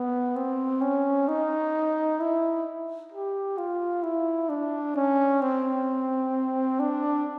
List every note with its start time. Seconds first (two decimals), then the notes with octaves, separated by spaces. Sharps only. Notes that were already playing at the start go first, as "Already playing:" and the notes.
Already playing: B3
0.36 C4
0.81 C#4
1.28 D#4
2.20 E4
3.12 G4
3.58 F4
4.03 E4
4.49 D4
4.96 C#4
5.41 C4
6.79 D4